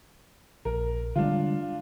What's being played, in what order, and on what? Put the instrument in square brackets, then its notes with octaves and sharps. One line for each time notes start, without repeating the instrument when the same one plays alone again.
[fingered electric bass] A#1 [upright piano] A#4
[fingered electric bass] D3 G3 G#3 [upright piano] D4 F4